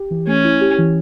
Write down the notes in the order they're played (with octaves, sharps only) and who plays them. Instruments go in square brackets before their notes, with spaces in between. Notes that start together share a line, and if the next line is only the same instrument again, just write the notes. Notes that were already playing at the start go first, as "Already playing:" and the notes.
Already playing: [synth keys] G4
E3
[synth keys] A3 [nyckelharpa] C#4
[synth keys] E4
G4
E3